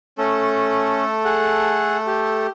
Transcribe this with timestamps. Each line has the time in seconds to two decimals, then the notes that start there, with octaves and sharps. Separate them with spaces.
0.18 A3 C#4 A4
1.25 G#4 F#5
2.07 G4